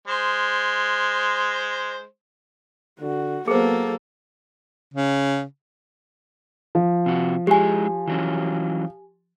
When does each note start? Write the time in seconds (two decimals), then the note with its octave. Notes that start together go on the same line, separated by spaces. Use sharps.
0.08 G#3 C5
3.01 D3 F#4
3.48 F#3 A#3 B3 G#4 A4 C5
4.94 C#3
6.75 F3
7.06 C3 F#4
7.47 G#3 E4 G4 G#4 G#5
8.08 E3 F#3 C#4